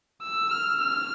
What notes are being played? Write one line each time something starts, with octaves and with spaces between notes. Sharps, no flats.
E6
F6
F6